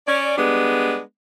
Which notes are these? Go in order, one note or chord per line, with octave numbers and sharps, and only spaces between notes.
C#4 D5
G3 G#3 B3 D4